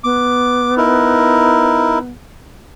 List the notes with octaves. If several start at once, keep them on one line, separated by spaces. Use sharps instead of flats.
B3 D6
D#4 E4 A#4